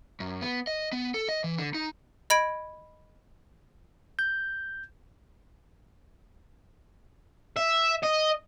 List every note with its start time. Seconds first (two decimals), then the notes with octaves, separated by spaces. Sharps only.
0.20 F#2
0.42 B3
0.67 D#5
0.92 B3
1.14 A4
1.29 D#5
1.44 E3
1.58 D3
1.74 D#4
2.30 D#5 B5 G#6 D7
4.19 G6
7.57 E5
8.03 D#5